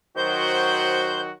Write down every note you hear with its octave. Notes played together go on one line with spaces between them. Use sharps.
D#3 F#3 F#4 C5 G6